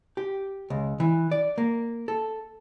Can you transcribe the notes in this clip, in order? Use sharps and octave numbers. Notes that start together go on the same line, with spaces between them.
G4
C#2
E3
D5
A#3
A4